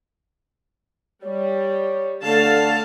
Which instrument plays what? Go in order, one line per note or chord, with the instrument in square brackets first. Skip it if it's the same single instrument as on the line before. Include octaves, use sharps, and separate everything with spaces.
[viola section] G3 [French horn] C#5
[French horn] D3 [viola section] A3 F5 A5